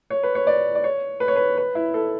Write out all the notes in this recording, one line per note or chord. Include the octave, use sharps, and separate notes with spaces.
C#5
B4
C#5
D5
D5
C#5
B4
C#5
B4
B4
E4
A4